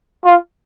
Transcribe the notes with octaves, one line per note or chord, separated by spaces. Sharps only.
F4